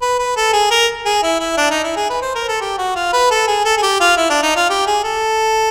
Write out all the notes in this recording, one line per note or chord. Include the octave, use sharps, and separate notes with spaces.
B4
B4
A4
G#4
A#4
G#4
E4
E4
D4
D#4
E4
G#4
B4
C5
A#4
A4
G4
F#4
F4
B4
A4
G#4
A4
G#4
G4
F4
E4
D4
D#4
F4
G4
G#4
A4